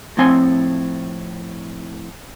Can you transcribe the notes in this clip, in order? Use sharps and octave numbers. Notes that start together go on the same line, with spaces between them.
A2 F3 C4 G#5 C6